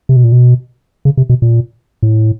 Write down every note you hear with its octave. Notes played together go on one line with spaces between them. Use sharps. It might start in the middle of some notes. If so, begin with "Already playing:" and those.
C3
B2
A#2
B2
C#3
C3
B2
A#2
A2